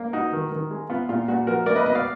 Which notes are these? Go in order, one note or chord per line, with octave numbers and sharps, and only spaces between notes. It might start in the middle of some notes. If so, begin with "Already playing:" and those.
Already playing: A#3
D#4 F#4
D#3
D#3
G#3
B3 F4
A#2 F4
A#2 F#4
F3 F#4 A#4
A#3 A#4 D5
B4 D#5
B2 B4 D#5
D5 F5